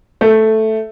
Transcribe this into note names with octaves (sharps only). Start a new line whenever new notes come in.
A3